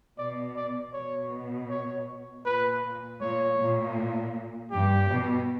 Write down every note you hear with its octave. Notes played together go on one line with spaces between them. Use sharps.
B2 D5
D5
B2 C#5
C#5
A#2 B4
A#2 C#5
A#2
G2 G4
B2